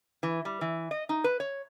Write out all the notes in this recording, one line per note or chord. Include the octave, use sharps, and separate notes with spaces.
E3
G3
E3
D#5
D#4
B4
C#5